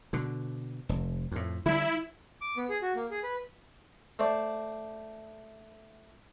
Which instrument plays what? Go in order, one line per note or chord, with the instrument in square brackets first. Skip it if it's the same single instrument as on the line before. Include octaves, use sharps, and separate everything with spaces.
[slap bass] B2 D3
F1
F2 A2
[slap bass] D3 G3 [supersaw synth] E4
[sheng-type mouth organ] D6
B3
G#4
F#4
A#3
G#4
B4
[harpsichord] A3 C5 D5